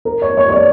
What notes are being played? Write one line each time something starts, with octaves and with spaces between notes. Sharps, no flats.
A#4
C#5
C#5
C#5
D5